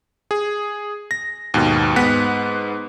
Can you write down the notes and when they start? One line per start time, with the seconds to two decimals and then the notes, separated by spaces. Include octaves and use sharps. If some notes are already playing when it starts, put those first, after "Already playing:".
0.31 G#4
1.11 A#6
1.54 D#2 G#2 B2
1.96 G#2 B3 F#5 F#6 B6